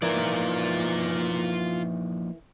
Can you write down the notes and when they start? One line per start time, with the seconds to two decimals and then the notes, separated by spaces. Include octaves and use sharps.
0.02 E3 F3 A#3 D#4 F4 A#4 D5